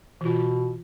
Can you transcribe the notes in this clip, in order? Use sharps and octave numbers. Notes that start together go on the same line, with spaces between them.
B2 E3 F4